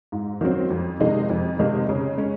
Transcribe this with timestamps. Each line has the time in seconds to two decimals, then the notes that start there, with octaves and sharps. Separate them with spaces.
0.12 G#2
0.41 D#3 F#3 C4
0.70 F2
1.00 C3 D#3 G#3 D#4
1.30 F2
1.59 C3 D#3 G#3 D#4
1.89 C#3
2.18 G#3 C#4